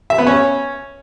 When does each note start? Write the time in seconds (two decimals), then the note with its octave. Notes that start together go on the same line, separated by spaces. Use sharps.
0.10 E5
0.18 B3
0.27 C#4